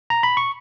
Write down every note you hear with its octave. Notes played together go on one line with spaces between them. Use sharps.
A#5
B5
C#6